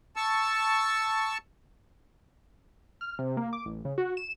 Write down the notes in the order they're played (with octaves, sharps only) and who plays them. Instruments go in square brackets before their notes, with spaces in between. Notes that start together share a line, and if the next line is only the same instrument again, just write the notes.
[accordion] A5 C#6 E6
[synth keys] F6
C3
A#3
D6
A1
C#3
F#4
E7